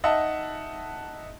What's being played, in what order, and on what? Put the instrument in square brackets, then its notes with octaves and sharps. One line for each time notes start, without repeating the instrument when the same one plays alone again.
[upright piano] D#4 D#5 E5 F#5 A5